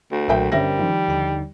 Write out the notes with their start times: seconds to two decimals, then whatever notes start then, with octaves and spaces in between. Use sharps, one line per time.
0.12 D2
0.28 B1 A#2 F#3 A#4 E5 G5
0.52 G1 G3 C#4 A#4 C5 E5 A#6
0.79 D#3 F3
1.08 D#2 D3 D#4